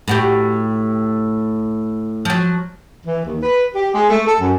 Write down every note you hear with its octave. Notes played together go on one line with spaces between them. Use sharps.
A2 F#4 G4
F3 F#3
E3
D#2
B4
G4
G#3
A3
A4
F#2